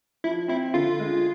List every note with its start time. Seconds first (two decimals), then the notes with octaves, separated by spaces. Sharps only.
0.24 F3 E4
0.48 C4 E4
0.74 D3 F4
0.99 G#3